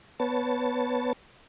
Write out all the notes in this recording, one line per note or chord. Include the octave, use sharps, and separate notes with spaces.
B3 B4 C#5 A5